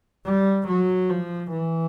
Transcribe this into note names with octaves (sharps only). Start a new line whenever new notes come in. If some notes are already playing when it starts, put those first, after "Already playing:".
G3
F#3
F3
E3